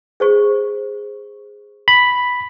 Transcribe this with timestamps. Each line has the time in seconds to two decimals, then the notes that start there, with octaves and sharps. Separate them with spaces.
0.20 G#4 C5 C#6
1.88 B5